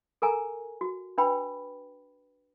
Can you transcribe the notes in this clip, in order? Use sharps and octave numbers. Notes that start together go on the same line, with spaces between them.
A4 A#4 G#5 A#5
F#4
D4 B4 G5 B5